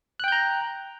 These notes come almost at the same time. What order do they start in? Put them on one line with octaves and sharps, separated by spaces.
F#6 G5 G6 A#5